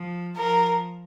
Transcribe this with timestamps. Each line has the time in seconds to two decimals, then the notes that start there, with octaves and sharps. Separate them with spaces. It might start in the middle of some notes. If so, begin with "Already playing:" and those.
Already playing: F3
0.37 F3 A#4